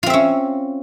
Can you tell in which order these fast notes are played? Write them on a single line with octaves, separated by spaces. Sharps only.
F4 C4 E5 C#4